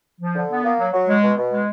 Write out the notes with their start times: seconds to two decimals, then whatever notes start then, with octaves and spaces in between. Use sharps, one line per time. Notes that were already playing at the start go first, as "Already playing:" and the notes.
0.20 F3
0.36 D3
0.50 B3
0.64 A#3
0.78 F#3
0.93 F#3
1.08 G#3
1.23 B2
1.37 B2
1.52 G#3